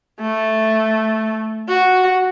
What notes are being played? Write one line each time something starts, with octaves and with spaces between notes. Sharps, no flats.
A3
F#4